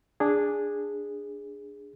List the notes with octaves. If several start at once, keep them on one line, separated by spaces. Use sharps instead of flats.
D4 G#4